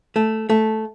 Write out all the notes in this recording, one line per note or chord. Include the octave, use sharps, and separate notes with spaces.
A3
A3